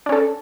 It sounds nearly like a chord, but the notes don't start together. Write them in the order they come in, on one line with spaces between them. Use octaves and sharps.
D4 C#4 A4